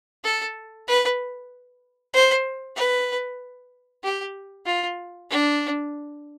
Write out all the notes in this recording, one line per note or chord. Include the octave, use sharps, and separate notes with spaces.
A4
B4
C5
B4
G4
F4
D4